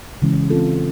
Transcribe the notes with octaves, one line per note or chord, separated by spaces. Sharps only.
C#3 E3 G#3 C#4
E3 G#3 C4 F4 A4